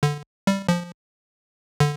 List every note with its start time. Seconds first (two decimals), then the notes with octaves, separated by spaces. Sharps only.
0.03 D3
0.47 G3
0.69 F3
1.80 D3